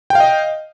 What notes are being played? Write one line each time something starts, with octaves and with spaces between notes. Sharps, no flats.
D#5 F5 G5